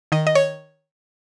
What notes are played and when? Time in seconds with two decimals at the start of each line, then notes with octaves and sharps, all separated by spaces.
0.12 D#3 D#5
0.27 D#5
0.35 C#5